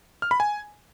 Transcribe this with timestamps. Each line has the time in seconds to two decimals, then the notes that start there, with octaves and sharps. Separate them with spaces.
0.22 F6
0.31 B5
0.40 G#5